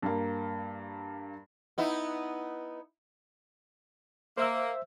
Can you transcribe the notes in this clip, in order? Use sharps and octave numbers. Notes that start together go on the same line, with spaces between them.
G2 A#3
B3 D#4 E4
A#3 C5 E5 E6